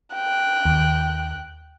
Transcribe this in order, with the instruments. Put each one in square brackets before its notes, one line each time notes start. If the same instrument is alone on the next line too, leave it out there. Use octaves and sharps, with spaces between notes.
[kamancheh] G5 F#6
[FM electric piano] D#2